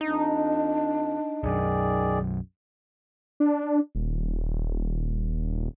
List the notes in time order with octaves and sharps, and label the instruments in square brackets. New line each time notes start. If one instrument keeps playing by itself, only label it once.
[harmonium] F2 [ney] D4 [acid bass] D#4
[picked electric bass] B1 F#2 [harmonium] D#3 G#4 D5
[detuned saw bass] D4
D#1